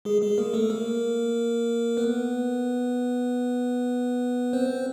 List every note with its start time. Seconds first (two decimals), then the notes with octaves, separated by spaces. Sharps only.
0.05 G#3 G#4
0.22 G#3 G#4
0.38 A#3 A#4
0.53 A3 A4
0.70 A#3 A#4
1.97 B3 B4
4.53 C4 C5